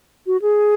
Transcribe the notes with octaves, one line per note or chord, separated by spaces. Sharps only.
F#4
G#4